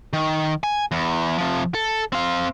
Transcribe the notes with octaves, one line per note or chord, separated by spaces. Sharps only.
D#3
G#5
E2
C3 F3
A4
C4 F5